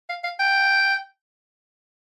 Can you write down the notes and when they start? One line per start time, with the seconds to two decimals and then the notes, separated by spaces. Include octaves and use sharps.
0.09 F5
0.24 F5
0.39 G5